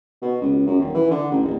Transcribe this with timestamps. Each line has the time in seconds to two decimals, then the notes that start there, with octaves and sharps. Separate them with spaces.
0.22 B2
0.42 C#2
0.67 F#2
0.79 D#1
0.94 E3
1.11 D3
1.32 A1
1.45 D1